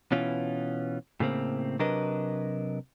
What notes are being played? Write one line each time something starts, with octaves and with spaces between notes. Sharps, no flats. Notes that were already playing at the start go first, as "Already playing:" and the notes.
B2 E3 C#4 F4
A2 C#3 A#3 C4
C3 F#3 D4 A#4 B4 D#5